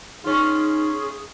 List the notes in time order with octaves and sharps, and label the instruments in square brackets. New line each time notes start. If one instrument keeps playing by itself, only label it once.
[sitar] C#4 F4 [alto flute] D#4 [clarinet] G#4